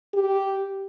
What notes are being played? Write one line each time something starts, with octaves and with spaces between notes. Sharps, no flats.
G4